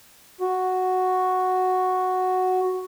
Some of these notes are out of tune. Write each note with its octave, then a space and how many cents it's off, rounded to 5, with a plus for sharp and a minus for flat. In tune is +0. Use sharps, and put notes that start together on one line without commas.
F#4 +0